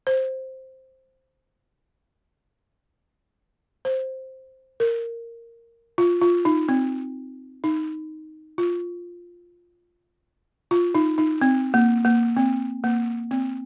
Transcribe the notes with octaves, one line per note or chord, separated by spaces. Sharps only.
C5
C5
A#4
F4
F4
D#4
C4
D#4
F4
F4
D#4
D#4
C4
A#3
A#3
C4
A#3
C4